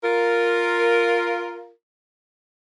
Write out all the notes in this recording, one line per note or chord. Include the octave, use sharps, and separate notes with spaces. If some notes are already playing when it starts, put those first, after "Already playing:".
F4 A#4